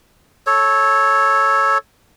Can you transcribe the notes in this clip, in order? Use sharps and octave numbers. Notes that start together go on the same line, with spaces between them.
A4 C#5